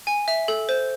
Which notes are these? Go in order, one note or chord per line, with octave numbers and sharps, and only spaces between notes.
G#5
E5
A4
C5